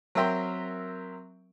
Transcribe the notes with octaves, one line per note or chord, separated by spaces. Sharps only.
F#3 C4 A#4 E5 G5 C6